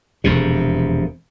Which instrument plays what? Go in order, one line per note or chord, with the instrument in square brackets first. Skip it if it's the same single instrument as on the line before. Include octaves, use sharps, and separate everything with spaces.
[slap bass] E1 F2 C3